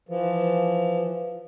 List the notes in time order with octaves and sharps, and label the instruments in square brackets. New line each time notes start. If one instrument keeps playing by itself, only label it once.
[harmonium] E3 F3